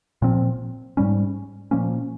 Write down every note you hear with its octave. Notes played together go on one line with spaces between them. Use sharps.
A#2 F3 C4
G#2 G3 C#4
A#2 F3 A#3 C#4